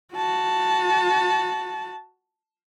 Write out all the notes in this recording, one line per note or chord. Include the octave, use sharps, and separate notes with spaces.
F#4 A5